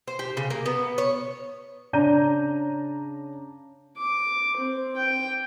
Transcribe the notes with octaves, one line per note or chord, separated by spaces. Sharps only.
C5
G4
C#3
A#3
B3
C#5
C#3 D4 A#5 G6 D#7
D6
C4
G5